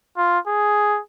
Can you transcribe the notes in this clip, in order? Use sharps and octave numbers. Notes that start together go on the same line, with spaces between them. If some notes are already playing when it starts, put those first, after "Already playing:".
F4
G#4